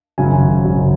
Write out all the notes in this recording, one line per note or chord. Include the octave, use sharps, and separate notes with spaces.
G#1 F#2 C#3 F#3 G#5
G#1 F#2 C#3 F#3